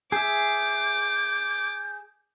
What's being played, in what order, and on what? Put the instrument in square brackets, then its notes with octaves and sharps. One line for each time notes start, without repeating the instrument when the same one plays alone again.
[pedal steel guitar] G#4 E5 [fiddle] D6 [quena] G6